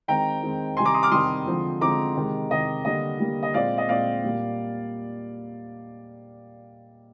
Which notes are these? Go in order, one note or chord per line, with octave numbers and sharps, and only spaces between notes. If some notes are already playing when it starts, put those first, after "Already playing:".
D#3 G#3 C4 G5 A#5
D#3 G#3 C4
C3 D#3 G3 G#5 C6
A#5 D6
C6 D#6
D6 F6
C3 D#3 G3 C6 D#6
D3 F3 G#3 C4
D3 F3 G#3 C4 A#5 D6
C3 D#3 G#3
C3 D#3 G#3 D#5
D3 G3 A#3 D#5
D3 G3 A#3
D#5
A#2 G#3 C4 D5 F5
D#5
A#2 G#3 C4 D5 F5
A#2 G3 A#3